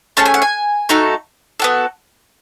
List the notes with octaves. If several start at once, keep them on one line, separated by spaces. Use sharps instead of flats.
A3 C#4 G#4 A5
G#5
F#5
G#5
A3 D#4 F#4 A4
B3 F#4 A4